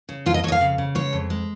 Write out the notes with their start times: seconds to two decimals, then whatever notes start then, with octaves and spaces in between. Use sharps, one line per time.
0.09 C#3
0.26 F2 F4
0.34 D#5
0.44 F2 C#5
0.48 D#5
0.52 F5
0.61 C#3
0.78 C#3
0.95 G#3 C#5
1.13 F2
1.30 G#3